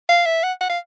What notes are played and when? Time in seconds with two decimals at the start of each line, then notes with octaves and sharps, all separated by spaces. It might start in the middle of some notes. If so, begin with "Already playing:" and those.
0.09 F5
0.26 E5
0.43 F#5
0.61 F#5
0.69 F5